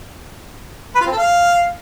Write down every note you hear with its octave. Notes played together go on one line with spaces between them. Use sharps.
B4
F4
C4
A4
F5